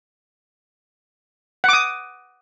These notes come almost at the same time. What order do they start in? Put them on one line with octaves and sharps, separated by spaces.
F#5 D6 D#6